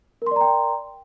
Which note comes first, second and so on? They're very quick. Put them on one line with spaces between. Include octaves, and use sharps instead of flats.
A#4 C6 D5 A#5 G5